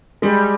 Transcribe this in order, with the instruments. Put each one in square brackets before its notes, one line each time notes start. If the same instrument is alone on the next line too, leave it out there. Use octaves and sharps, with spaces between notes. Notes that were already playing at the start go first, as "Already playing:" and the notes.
[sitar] G3 [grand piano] G#3